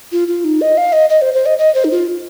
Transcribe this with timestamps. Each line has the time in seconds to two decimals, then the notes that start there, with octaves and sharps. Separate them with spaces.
0.12 F4
0.28 F4
0.44 D#4
0.61 D#5
0.77 F5
0.93 D#5
1.10 D#5
1.22 C5
1.34 C5
1.46 D#5
1.58 D#5
1.75 C5
1.85 D#4
1.91 F4